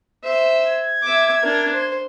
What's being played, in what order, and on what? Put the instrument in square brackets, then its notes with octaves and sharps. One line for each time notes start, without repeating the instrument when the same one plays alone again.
[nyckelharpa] C5 E5
[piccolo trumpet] G#6
[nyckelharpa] E5 D6
D4 A#4
C5